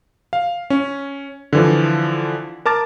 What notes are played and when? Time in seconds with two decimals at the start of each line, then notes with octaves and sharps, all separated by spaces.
0.33 F5
0.70 C#4
1.53 D3 E3 F3
2.66 A#4 A5 D6 A6